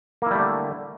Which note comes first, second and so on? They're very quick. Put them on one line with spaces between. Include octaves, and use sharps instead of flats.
A#3 E4 G3 A3 D3